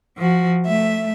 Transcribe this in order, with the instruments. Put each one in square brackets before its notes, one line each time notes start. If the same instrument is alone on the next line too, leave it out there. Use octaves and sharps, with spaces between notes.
[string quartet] F3 F#4
A3 E5